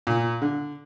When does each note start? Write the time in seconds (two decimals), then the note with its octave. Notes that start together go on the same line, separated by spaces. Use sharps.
0.07 A#2
0.42 D3